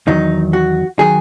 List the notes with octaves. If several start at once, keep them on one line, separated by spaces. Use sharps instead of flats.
E2 D#3 F#3 D#4
F#4
D#3 F#3 G#4